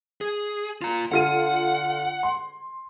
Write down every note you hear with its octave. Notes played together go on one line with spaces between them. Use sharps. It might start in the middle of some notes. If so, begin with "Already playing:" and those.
G#4
F4 A#5
D3 F4 F#5 D#7
C6